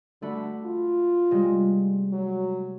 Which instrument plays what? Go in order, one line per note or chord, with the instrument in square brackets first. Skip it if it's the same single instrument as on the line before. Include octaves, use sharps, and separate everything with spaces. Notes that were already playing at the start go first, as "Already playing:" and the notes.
[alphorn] D3 [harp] A3 F#4 B5
[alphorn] F4
[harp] C3 G3 G#3
[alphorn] F#3